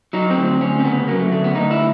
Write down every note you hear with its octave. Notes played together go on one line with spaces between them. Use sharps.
F#3 D#4
C4
D2
C4
D2 C#4
C4
C#3 B3
F#3 A#3
A3
D2 A3
B3
D2 D#4
E4